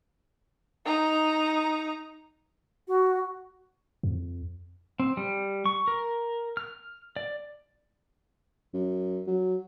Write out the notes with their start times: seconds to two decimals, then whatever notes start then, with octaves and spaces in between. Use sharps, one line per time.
0.85 D#4 A#5
2.88 F#4
4.03 F2
5.00 C4
5.17 G3
5.66 C#6
5.88 A#4
6.57 F6
7.16 D5
8.73 F#2
9.27 F#3